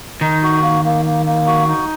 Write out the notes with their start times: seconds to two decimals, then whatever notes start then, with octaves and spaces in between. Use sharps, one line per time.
0.21 D#3 D#4
0.43 F#4
0.63 A#3
0.85 A#3
1.05 A#3
1.26 A#3
1.47 F#4
1.68 D#4